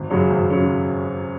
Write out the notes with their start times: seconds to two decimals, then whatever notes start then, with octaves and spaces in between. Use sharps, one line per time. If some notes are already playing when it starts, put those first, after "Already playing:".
Already playing: G#1
0.10 F#2 C#3 F#3 C#4
0.30 G#1
0.50 C#3 F#3 C#4